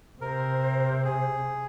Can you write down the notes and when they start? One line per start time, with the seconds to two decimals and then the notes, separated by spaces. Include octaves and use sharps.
0.21 C3 A#4 C5
1.05 G#4